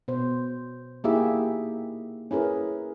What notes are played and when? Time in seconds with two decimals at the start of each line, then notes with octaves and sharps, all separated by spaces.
0.08 B2 C5
1.04 A#3 D#4 E4 G4 G#4 E5
2.31 C#4 E4 G#4 A#4 B4